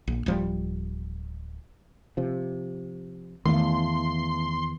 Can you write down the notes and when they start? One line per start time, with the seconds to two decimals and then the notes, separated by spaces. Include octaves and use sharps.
0.07 A#1
0.26 D1 F3 G3
2.17 C3 F3
3.45 E2 D#3 A3 F5 C6